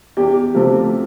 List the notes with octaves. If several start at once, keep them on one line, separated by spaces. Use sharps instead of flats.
E2 G4
C3 F3 A3 C4